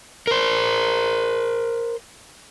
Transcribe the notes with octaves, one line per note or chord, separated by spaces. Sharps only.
A#4 C5